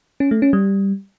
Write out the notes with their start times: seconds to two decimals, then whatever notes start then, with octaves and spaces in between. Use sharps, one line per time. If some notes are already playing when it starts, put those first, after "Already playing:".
0.20 C#4
0.31 A3
0.42 C#4
0.53 G3